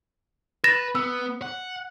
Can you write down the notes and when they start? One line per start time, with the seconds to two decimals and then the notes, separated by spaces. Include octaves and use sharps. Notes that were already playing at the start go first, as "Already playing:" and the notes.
0.64 B4 A6 A#6 E7
0.95 B3 E6
1.42 F#5